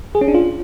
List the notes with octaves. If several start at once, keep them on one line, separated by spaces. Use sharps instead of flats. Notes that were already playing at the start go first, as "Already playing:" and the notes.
G#4
C#4
D4
F4